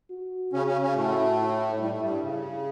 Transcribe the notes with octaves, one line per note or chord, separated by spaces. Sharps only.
F#4
C#3 C#4
C#3 C#4
C#3 C#4
A2 A3 F#4
E4
G3 E4
A3
G2 G3
C#3